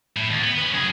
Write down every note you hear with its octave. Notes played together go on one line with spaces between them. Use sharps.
A2
D#2
B3
C#4 B4
F#2 G#4